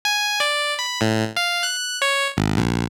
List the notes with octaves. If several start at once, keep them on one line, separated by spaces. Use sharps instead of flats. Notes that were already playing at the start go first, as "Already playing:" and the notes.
G#5
D5
B5
A2
F5
F#6
C#5
G#1
A#1